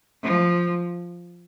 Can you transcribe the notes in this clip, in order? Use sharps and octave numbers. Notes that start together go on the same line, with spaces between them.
F3